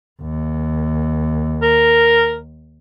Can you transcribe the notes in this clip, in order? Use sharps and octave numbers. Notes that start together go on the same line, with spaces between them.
D#2
A#4